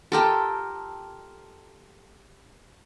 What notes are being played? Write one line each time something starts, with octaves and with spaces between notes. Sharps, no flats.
F4 G4 A4 A#4 G5 A5